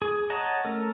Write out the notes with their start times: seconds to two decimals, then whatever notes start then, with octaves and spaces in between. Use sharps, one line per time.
0.02 G#4
0.30 C#5 D#5 F#5 A5 A#5
0.65 A3 C#4 A4 A#4